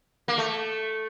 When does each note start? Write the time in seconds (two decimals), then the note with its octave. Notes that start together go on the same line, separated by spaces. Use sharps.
0.28 A#3
0.38 A3